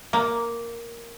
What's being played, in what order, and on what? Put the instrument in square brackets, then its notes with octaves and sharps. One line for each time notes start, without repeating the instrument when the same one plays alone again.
[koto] A#3